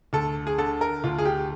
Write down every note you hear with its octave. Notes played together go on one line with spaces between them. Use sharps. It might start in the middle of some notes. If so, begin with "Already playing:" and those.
D2 A4
G#4
D3 A4
A#4
D2 F4
G#4
G4